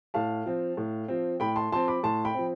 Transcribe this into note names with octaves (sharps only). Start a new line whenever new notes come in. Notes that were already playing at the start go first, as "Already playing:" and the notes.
A2 F5 A5
F3 C4
A2
F3 C4
A2 G5 B5
A5 C6
F3 C4 A5 C6
B5 D6
A2 A5 C6
G5 B5
F3 C4